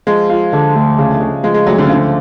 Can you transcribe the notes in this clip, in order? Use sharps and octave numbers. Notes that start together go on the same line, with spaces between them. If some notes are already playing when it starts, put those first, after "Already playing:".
F3 G#3
F4
D3
D2
C#3
C#3
F3 G#3
G#3
D2 F#3
D3
C#3
D3 F3